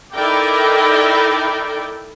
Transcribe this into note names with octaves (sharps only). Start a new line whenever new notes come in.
D#4 E4 A4 A#4 D5 G5